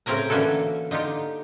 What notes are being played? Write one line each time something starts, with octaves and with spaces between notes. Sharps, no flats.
A2 C#3 C4 C#4 A#4 A#5
D3 E3 A#3 C#4 F#4 A4
D3 D#4 F4 G4